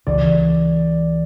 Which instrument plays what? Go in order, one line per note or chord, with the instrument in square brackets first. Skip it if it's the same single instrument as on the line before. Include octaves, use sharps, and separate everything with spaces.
[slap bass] C#2 C#3 E3 [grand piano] D5